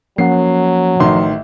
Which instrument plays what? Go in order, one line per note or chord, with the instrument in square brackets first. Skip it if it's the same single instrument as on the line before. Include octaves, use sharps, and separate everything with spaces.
[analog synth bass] F3 [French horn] F#3 [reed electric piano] A#3 C#4 F#5 [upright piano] C7
[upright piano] A1 D#3 C6 [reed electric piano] E5